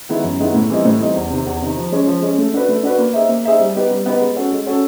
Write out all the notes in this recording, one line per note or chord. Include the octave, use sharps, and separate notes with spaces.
D#3 G#3 B3 E4
F#2
D#3 G#3 B3 E4
A2
E3 G3 C4 D#4
A2
E3 G3 C4 D#4
E2
C3 D#3
E2
C3 D#3
F3
G#3 C#4
F3
G#3 C#4
A3
D4 F#4 B4
A3
D4 F#4 B4
A#3
D#4 G#4 C5 E5
A#3
D#4 G#4 C5 E5
G3
B3 D#4 G4 B4
G3
B3 D#4 G4 B4
G#3
C#4 F#4 A4
G#3
C#4 F#4 A4